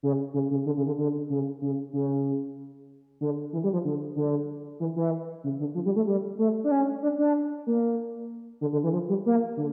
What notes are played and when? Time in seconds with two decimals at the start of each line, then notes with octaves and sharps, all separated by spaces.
0.03 C#3
0.34 C#3
0.51 C#3
0.66 D3
0.77 C#3
0.87 D3
0.98 D3
1.30 C#3
1.62 C#3
1.93 C#3
3.21 D3
3.53 E3
3.64 G3
3.73 F3
3.85 D3
4.16 D3
4.80 E3
4.96 E3
5.44 C#3
5.60 D3
5.75 F3
5.86 G3
5.96 A3
6.07 G3
6.38 A3
6.64 D4
6.71 C#4
7.03 D4
7.18 D4
7.67 A#3
8.61 D3
8.72 D3
8.84 E3
8.93 F3
9.09 G3
9.26 A#3
9.57 D3